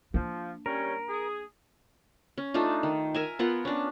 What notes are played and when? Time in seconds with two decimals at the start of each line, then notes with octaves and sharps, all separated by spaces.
0.14 F3 A#3 D4
0.66 G3 C#4 A#4
1.08 G#4
2.38 C#4
2.54 A3 D4 D#4 F4
2.83 D#3
3.14 A#4 E5 G#5
3.39 B3 F4 A#4 F#5
3.65 C#4 D4